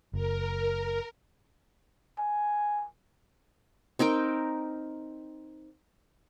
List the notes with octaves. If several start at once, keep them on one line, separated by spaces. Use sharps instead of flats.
F#1 A#4
G#5
C4 D#4 A#4 G5